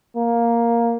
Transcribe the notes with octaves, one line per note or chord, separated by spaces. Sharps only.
A#3